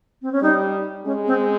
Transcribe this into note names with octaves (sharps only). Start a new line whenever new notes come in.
C4
C#4
G3 D#4
G#3 C#4
C4